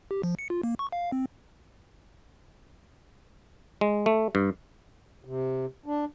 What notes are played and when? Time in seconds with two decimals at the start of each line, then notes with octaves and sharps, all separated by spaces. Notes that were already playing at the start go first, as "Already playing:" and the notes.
0.11 G4
0.23 F3
0.39 C#7
0.50 F4
0.63 A#3
0.79 C#6
0.92 F5
1.12 C4
3.81 G#3
4.06 A3
4.35 G2
5.25 C3
5.86 D4